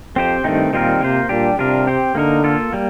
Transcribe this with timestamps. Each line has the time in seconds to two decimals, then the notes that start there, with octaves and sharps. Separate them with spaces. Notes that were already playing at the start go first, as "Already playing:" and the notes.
0.16 F2 C4 G4 C5
0.44 G2 D#3 A3 C4 D#4
0.72 A#2 D#3 G3 C4 F4 A#4
1.01 C3 A#3 F4 C5
1.29 A#2 G3 D4 G4
1.58 C3 G3 D4 F4 A#4
1.87 C4 G4 C5
2.15 D3 A#3 D#4 A#4
2.44 A#3 F4 A4
2.73 G3 A#3